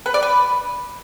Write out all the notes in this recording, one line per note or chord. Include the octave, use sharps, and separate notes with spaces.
B4
D5
B4